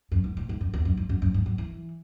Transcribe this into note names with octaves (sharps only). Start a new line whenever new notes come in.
F#2
G#2
A2
G#2
F#2
E2
F#2
G#2
F#2
F#2
G#2
F#3
E3